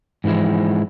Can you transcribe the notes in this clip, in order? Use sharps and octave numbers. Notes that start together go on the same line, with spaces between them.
G#2 E3 F3 G#3 E4